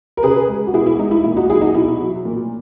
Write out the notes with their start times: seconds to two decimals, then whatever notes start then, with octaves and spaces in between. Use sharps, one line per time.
0.17 A#4
0.23 C#3 G#4 B4
0.48 G#3
0.67 F#4
0.73 B2 E4 G#4
0.86 E4
0.99 G#3 D#4
1.11 E4
1.24 A#2 E4
1.37 D#4 F#4
1.49 F#3 E4 G#4
1.61 D#4 F#4
1.74 B2 E4
2.00 F#3
2.25 A#2